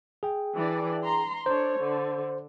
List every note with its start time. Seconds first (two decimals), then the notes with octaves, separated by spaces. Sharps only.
0.23 G#4 G5
0.54 E3 D4 D5
1.02 A#5 C6
1.46 D4 A4 C5 C#5
1.78 D3